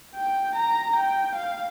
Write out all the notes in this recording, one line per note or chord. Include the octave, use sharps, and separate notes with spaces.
G5
A#5
G5
F5